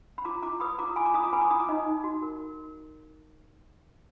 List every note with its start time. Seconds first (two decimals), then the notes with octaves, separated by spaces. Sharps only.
0.18 B5
0.25 F4 A#5 D6
0.42 F4 A#5 D6
0.60 B4 B5 D#6
0.79 F4 A#5 D6
0.96 F4 G#5 B5
1.05 A#5 D6
1.14 F4 B5 D#6
1.23 A#5 D6
1.32 B4 G#5 B5
1.41 A#5 D6
1.50 F4 B5 D#6
1.60 A#5 D6
1.69 D#4 D#5
1.86 D#4
2.04 F#4
2.22 A#4